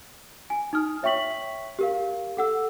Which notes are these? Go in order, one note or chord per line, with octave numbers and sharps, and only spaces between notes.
G#5
D#4 D#6 F6
C#5 E5 G5 C#6 B6 F#7
G4 A#4 F5
A4 F#5 E6